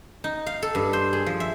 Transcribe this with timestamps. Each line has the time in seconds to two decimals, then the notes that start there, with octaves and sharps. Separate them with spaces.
0.24 D#4
0.46 F5
0.62 A4
0.75 G2
0.93 C5
1.13 G#4
1.26 F3
1.40 E5